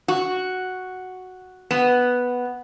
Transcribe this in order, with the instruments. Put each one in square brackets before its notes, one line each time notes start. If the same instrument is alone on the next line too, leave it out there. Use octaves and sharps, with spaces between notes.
[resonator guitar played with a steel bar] F#4
B3